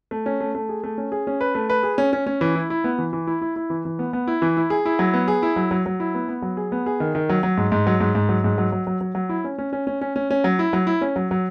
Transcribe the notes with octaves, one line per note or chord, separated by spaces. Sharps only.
A3
C#4
A3
A3
G#4
A3
C#4
G#4
C#4
B4
A3
B4
G#4
C#4
C#4
C#4
E3
E4
E4
B3
E3
E3
E4
E4
E4
E3
E3
B3
B3
E4
E3
E4
G#4
E4
F#3
B3
G#4
E4
F#3
F#3
F#3
E4
B3
B3
F#3
G#4
B3
G#4
D#3
D#3
F#3
F#3
G#2
G#2
F#3
G#2
G#2
F#3
G#2
F#3
F#3
F#3
F#3
F#3
E4
C#4
C#4
C#4
C#4
C#4
C#4
C#4
F#3
E4
F#3
E4
C#4
F#3
F#3